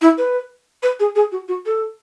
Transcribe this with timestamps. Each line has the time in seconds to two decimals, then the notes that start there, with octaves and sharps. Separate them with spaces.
0.01 E4
0.18 B4
0.83 B4
1.00 G#4
1.15 G#4
1.32 F#4
1.48 F#4
1.66 A4